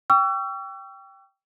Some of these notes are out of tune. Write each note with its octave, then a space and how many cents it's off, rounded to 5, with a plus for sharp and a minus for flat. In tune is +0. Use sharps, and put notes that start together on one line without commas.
G5 +0 C#6 +35 E6 +40